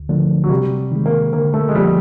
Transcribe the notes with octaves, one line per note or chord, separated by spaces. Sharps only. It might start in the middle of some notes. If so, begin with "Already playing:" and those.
Already playing: D2
D3 F3 A3 D4
F#3
C3 G3
D#3 G#3
A#3
D3 A#3
A3
G#3
F3 G3 A#3